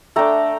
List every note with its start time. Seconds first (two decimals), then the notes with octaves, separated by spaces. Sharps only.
0.16 A3 D4 G5 A#5